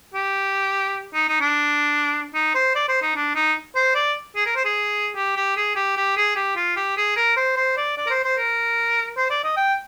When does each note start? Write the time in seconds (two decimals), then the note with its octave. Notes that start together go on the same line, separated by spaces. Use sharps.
0.14 G4
1.14 D#4
1.28 D#4
1.40 D4
2.34 D#4
2.54 C5
2.75 D5
2.88 C5
3.02 D#4
3.15 D4
3.35 D#4
3.75 C5
3.95 D5
4.36 G#4
4.46 A#4
4.56 C5
4.65 G#4
5.15 G4
5.36 G4
5.56 G#4
5.75 G4
5.96 G4
6.17 G#4
6.35 G4
6.56 F4
6.76 G4
6.97 G#4
7.16 A#4
7.37 C5
7.56 C5
7.77 D5
7.97 D5
8.07 A#4
8.10 C5
8.24 C5
8.37 A#4
9.17 C5
9.30 D5
9.44 D#5
9.57 G5